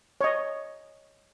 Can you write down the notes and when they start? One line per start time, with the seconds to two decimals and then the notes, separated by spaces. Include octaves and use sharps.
0.21 C#5 D#5